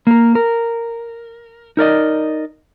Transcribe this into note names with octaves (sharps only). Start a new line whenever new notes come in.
A#3 A#4
A#4
D#4 A#4 D5 D#5